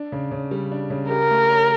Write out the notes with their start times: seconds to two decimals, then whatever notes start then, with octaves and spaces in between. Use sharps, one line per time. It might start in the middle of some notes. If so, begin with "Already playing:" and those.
Already playing: D4
0.12 C#3
0.31 C#3
0.51 G3
0.72 D4
0.90 C#3
1.10 G4 A#4
1.30 A3
1.50 C#5